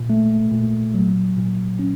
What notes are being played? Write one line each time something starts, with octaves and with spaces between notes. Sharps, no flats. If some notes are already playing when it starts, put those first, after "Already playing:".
Already playing: A#2
A3
A#2
F#3
A#2
C#4